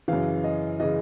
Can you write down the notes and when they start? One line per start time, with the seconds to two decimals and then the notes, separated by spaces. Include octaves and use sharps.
0.08 F#2 C#3 E3 F5
0.44 D#5
0.80 C#3 E3 D#5